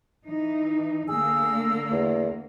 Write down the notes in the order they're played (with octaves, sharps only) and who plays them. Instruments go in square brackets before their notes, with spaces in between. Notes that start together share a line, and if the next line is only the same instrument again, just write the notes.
[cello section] E3 D#4
[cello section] D3 A#3 [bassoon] G#4 [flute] E6
[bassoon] E2